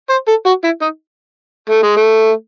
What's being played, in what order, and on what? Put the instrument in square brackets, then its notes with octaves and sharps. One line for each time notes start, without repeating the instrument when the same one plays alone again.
[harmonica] C5
A4
F#4
E4
D#4
A3
G#3
A3